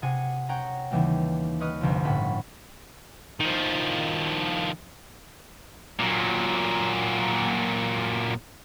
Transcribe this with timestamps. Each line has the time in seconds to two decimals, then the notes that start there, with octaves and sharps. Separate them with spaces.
0.02 C3 G#4 F#5 G#5 C#7
0.49 C#4 C#5 F#5 G5 A#5
0.91 D#2 C#3 E3 G3 A#3
1.60 B4 C#5 D#5 D#6 F6 F#6
1.81 G1 C2 D3 F3
2.04 G1 A2 C#4 A4 F#5 B5
3.40 D#3 F3
5.99 A#2 F#3